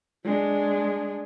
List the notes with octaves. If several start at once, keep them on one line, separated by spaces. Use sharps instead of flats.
G#3 D4